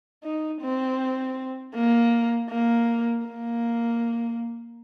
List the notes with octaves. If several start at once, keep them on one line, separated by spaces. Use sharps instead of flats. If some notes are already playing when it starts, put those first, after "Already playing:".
D#4
C4
A#3
A#3
A#3